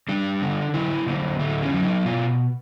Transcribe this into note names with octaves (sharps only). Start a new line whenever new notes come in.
G3 D4
D3
F#3 E4
D3 A#3
A2 A3
C#4
F#3
E4
D#4
B2 F4